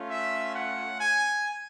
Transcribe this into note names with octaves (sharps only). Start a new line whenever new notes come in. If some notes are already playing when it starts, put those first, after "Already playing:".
Already playing: A3 C#4 F4
E5
F#5
G#5